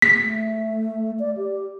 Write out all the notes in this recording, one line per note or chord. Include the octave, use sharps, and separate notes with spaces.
B6
A3
D5
G4